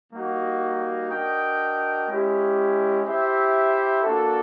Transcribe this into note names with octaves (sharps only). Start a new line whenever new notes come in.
G3 A#3 D#4 F#4
D4 F#4 A#4 D#5 G5
G#3 C#4 E4 G4
E4 G4 C5 E5
A#3 D4 F#4 A4